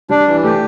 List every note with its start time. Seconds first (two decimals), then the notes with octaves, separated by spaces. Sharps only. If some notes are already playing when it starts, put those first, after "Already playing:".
0.10 G3 D4
0.28 E3
0.43 A3 G4